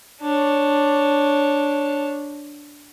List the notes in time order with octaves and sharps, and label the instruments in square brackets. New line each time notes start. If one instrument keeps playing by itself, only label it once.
[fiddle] D4 C#5